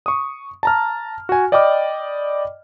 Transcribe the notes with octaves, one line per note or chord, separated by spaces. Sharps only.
C#6 D#6
A5 A#5 F6
F#4 G#5
D5 D#5 G5 B5 D6 F6